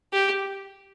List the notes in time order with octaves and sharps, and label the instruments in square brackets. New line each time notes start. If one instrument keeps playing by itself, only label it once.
[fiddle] G4